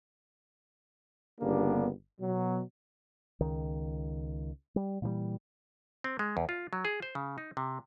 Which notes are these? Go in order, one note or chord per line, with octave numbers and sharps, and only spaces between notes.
G1 C#3 A#3 B3 D4 G4
B2 F#3
C#2 D#3
G3
A#2 E3 F3 G3
C4
G#3
E2
F4
F#3
G#4
C5
C#3
D#4
C3